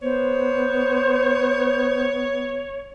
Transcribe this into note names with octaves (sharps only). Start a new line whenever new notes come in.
B3 C5 C#5